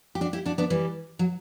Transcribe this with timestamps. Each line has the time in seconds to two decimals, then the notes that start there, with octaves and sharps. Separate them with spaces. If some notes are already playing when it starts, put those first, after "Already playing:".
0.15 G4
0.21 D4 F#4
0.33 E4 G4
0.45 D4 F#4
0.58 B3 D4
0.70 E3 G3
1.19 F#3